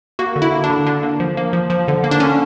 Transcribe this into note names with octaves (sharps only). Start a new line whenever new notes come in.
A#3 F#4
D3
E4
A#3
D4
D3
D3 D4
A#3
F3
A#3
F3
F3
D3
A#3
D4
D3 C#4